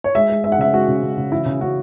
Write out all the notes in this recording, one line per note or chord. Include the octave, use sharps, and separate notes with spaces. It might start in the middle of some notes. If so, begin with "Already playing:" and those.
C#5
G#3 E5
G#3
G#3 E5
F#5
C#3 E5
G#3 F#4
C#3
C#3
C#3
E3 E4
C#3
C#3 F#4